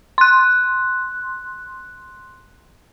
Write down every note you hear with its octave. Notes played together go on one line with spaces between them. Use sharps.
C6 F#6